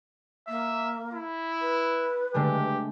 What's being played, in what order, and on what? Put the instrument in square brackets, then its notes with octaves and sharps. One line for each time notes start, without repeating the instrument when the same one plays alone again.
[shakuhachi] A#3 [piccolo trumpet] E5
[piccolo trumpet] E4
[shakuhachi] B4
[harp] D3 G#3 A3 [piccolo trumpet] G4